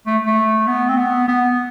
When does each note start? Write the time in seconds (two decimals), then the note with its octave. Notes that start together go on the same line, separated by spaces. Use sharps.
0.06 A3
0.27 A3
0.67 B3
0.89 C4
0.97 B3
1.28 B3